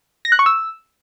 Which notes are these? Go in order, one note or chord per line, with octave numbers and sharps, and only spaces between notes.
A#6
F#6
C#6
E6